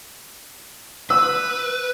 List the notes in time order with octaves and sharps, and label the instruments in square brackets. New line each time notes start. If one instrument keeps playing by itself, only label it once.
[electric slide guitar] B4 [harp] E6